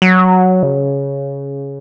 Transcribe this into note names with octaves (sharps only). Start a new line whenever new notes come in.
F#3
C#3